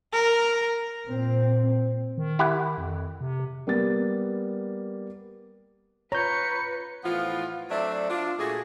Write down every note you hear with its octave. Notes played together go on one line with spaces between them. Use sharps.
A#4
A#2 C4
D#3
E4 G4 F#5
F2
C3
G3 A#3 B3 A6
F4 B4 C#5 A#5 G6 C#7
A2 E3 F3 B3 F4
F#3 A3 C4 D4 D5 E5
D4 F4
A#2 A3 F#4 G#4